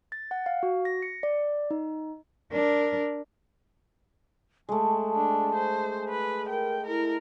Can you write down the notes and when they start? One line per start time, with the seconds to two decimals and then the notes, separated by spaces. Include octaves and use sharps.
0.12 A6
0.31 F#5
0.46 F5
0.63 F#4
0.85 A#6
1.02 C#7
1.23 D5
1.71 D#4
2.52 D4 A#4
4.69 G#3 A3 A5
5.15 D4
5.55 C5
6.09 B4
6.50 A#4 G5
6.87 E4 A#4